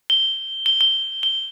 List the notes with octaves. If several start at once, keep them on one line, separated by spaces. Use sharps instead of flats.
G7
G7
G7
G7